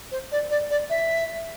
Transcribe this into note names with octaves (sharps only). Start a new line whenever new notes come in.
C5
D5
D5
D5
E5